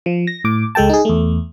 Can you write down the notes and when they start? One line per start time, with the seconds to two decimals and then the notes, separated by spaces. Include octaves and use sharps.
0.06 F3
0.27 A#6
0.44 A2 D6
0.75 C#2 G#3 A4 G5 A5
0.90 D#4 G#4
1.05 E2 A3